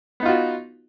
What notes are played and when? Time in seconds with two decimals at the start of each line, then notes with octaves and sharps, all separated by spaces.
0.20 B3
0.23 D#4
0.26 F4
0.28 F#4